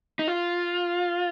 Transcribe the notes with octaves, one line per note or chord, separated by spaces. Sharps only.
D#4
F4